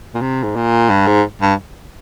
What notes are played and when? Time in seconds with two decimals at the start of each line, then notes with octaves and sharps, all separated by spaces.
0.15 A#2
0.21 C3
0.44 G#2
0.56 A#2
0.90 G2
1.07 G#2
1.42 G2